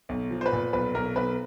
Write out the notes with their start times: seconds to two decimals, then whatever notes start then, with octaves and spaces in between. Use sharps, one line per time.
0.09 B1
0.30 F3
0.41 C5
0.46 B4
0.52 A#2
0.73 B1 B4
0.94 B1 A#4
1.16 B1 B4